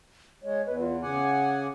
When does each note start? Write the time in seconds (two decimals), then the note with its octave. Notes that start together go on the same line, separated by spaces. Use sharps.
0.43 G#3 C#5
0.67 E2 B4
0.80 F4
1.02 C#3 F#5 G#5 D6